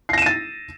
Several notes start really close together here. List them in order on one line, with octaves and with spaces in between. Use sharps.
C7 A#6 E7 D#7 A6